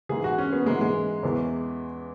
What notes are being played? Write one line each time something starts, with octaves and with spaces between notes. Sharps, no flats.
G#2 E3 G#4
F#4
C#4
B3
G#2 E3 G#3
G#3
E2 E3